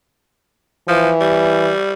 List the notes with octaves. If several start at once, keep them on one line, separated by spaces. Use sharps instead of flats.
E3 F3
G3